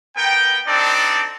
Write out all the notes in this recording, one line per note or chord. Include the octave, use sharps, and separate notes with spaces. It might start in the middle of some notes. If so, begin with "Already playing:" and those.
B3 A#4 G5
C4 D4 D#4 A4 D5